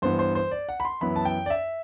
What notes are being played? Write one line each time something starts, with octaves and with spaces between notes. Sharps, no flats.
G2 E3 B3 C5
C5
C5
D5
F#5
B5
C6
F#2 E3 B3 E4 B5
A5
G5
D5
E5